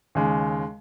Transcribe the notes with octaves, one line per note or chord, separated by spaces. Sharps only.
D#2 C#3 G#3